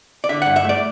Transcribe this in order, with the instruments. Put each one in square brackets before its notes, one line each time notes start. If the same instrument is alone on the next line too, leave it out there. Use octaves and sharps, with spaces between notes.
[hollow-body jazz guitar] D5
D3 E5
G2 F#5
E5
A3 D5